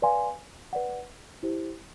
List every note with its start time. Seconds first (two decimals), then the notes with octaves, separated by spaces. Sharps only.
0.02 B4 D5 F5 G#5 C6
0.73 B4 D5 F#5
1.43 E4 G4 C5